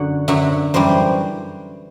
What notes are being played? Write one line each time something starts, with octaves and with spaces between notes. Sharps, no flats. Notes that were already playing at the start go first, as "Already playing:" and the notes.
Already playing: F#2 D3 F#3 F#5
F#2 D3 F#3 E5
F#2 E3 G3 C5